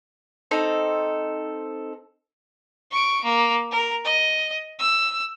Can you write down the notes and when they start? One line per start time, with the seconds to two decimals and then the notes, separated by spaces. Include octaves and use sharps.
0.51 C4 D#4 A4
2.91 C#6 D7
3.24 A#3
3.71 A#4
4.05 D#5
4.79 E6